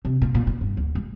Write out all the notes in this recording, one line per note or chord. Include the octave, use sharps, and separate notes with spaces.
C3
A#2
A#2
A#2
G2
D2
G#3